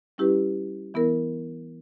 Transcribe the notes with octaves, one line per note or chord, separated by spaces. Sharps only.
G3 C#4 E4 G4 B4
E3 B3 E4 A#4